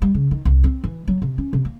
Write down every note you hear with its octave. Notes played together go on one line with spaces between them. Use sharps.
G3
C#3
D#3
C2
C4
E3
F#3
C3
C#4
C3
A#3